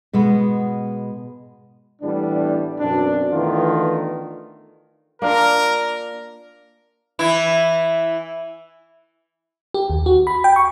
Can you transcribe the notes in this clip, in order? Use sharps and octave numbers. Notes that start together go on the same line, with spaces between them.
B2 G#3 B3 B4
A2 E3 G3 B3 D4
F#2 B2 C4 D4
D#3 E3 A3 B3 D4 F4
A#3 D4 F4 A#4
E3 E4
G4
D#2
F#4
B5
G5
C#6